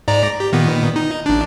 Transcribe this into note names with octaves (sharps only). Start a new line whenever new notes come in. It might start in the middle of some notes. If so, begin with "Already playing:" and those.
G#2 D5 A#5
G4
A#2 D#3 B3
D#4
A1 D4